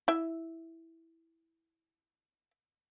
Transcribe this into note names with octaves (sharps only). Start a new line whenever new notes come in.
E4 E5